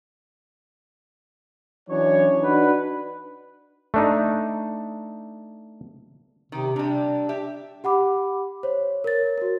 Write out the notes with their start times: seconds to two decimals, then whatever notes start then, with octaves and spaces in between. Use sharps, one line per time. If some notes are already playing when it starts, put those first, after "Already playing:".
1.89 E3 F#3 C#4 D4 C#5
2.42 D4 D#4 F#4 B4
3.94 A3 D4 D#4
6.52 C3 D#3 G4
6.76 C3 G3 D4
7.29 G4 E5
7.84 G4 F#5 B5 D6
8.63 C5 C#5
9.04 A#4 C#5 A6
9.38 F#4 A#4